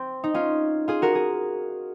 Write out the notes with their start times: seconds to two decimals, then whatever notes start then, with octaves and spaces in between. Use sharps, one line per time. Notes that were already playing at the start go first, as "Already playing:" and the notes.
Already playing: C4
0.24 D#4
0.34 C#4 F4
0.88 F4 G#4
1.02 F#4 A#4
1.15 G#4